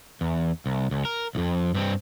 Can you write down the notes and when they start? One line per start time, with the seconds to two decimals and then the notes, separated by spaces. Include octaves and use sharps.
0.21 E2
0.66 C2
0.91 C#2
1.05 A#4
1.35 C2 F2
1.74 G2 C4